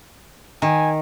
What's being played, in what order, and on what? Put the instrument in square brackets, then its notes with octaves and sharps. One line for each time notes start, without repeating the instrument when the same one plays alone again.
[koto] D#3 [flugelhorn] G#5